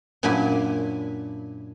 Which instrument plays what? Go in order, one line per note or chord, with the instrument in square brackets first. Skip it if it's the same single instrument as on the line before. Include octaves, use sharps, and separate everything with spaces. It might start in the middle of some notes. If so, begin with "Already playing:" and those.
[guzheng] F#2 A#2 D4 E4 G#5 B5